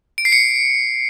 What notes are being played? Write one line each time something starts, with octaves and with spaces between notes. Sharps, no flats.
D7
C7
C#7